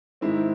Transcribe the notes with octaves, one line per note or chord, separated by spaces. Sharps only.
G#2 D#3 G#3 C4 E4